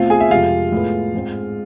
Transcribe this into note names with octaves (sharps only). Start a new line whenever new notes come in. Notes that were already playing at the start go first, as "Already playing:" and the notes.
Already playing: B2 A3 C4 F4 F5
G#4 G#5
E5
F2 C3 G#3 F4 F5
A2 G#3 B3
G#2 G#3 C4